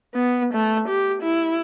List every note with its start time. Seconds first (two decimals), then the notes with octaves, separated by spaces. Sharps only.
0.14 B3
0.54 A3
0.89 G4
1.22 E4